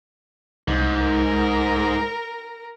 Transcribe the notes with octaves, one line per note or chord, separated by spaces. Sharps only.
C2 G#2
A#4